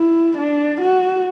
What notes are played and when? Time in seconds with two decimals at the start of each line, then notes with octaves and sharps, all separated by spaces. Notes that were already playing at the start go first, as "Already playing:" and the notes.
Already playing: E4
0.37 D4
0.81 F#4